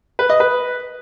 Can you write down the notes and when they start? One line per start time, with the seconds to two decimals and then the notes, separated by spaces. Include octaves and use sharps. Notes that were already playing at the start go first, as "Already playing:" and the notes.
0.19 B4
0.29 D#5
0.40 B4